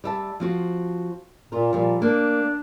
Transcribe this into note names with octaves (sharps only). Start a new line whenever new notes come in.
G3 E5 A5
F3 C4 F#4
A#2 F4 A#4
A#2 F3 G3
A#3 D4